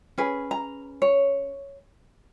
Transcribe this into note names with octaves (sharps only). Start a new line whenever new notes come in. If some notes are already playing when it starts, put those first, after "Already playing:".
C#4 G#4 B4
A#5
C#5